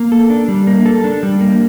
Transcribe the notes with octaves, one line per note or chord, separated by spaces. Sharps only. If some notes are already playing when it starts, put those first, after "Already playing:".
Already playing: A#3
A4
D4
G3
A#3
A4
D4
G3
A#3